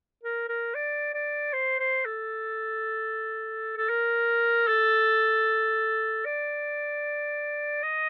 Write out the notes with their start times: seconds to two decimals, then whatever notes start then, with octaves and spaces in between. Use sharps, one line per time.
0.23 A#4
0.49 A#4
0.75 D5
1.14 D5
1.53 C5
1.79 C5
2.05 A4
3.77 A4
3.89 A#4
4.67 A4
6.25 D5
7.83 D#5